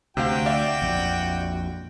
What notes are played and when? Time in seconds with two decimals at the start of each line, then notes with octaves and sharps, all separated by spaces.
0.17 D2 C3 F#4 C5 F5 G5
0.46 D5 E5 F5
0.82 A#1 F2